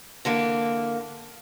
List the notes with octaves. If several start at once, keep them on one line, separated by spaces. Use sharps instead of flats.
D3 E3 A#3